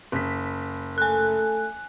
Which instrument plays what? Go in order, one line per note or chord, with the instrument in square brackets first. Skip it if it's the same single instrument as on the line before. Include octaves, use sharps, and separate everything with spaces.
[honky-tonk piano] F#1 B6
[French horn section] A3 A4 [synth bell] G#5 F#6